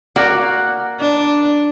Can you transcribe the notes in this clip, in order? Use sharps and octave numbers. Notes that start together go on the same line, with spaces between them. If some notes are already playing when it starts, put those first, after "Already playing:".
A#3 F#4 D5
D4